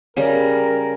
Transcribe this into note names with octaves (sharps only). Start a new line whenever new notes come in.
C#3 G3 A#4